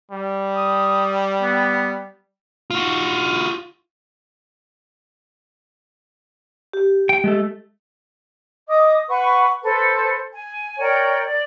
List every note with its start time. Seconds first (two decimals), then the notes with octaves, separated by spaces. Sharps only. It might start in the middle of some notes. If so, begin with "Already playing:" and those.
0.11 G3
0.56 D#6
1.42 B3
2.70 F4 F#4
6.73 G4
7.09 G5
7.24 G#3 A3 A4
8.68 D#5 D6 D#6
9.09 B4 F#5 C#6
9.62 A4 B4 C5
10.32 G#5
10.78 A#4 C#5 D5 G5
11.24 D5